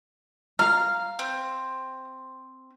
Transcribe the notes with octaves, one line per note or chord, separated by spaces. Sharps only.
F5 A#5 F6
C4